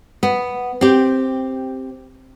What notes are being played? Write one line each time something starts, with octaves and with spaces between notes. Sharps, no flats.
B3
C4 G4